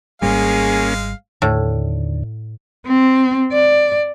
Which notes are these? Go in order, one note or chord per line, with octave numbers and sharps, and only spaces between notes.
G#1 G#2 G3 G#3 A#3 C#4 G#4 F5
D#2 A2 D3
C4
D5